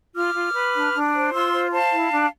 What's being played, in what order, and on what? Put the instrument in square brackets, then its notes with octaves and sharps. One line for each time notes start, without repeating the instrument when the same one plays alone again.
[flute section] F4 D6 F6
F4
B4
D4
D4
C5
F4 C6 E6
C5
C5 F5 A5
E4
D4